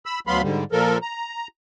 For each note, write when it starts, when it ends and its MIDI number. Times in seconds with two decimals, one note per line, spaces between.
0.06 0.20 83
0.06 0.20 88
0.27 0.42 38
0.27 0.42 54
0.27 0.42 59
0.27 0.42 77
0.27 0.42 83
0.27 0.42 84
0.42 0.64 44
0.42 0.64 50
0.42 0.64 55
0.72 0.98 46
0.72 0.98 53
0.72 0.98 69
0.72 0.98 70
1.02 1.47 82